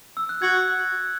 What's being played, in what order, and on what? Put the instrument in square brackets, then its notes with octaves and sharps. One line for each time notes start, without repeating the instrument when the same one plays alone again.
[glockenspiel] E6
F#6
[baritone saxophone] F#4 [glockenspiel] G#6